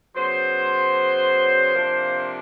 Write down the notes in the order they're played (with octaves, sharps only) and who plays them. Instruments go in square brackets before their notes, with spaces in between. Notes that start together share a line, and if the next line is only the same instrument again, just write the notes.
[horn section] C#3 F#3 B3 C5
C3 F3 A#3 D4